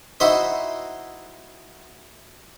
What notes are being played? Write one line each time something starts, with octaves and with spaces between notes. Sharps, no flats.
D#4 E4 F#4 C5 D#5